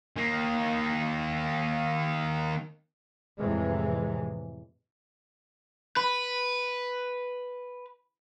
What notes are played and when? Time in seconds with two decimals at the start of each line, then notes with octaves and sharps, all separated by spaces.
0.17 D#3 A#3
3.39 F2 A2 C3 E3 G#3
5.97 B4 B5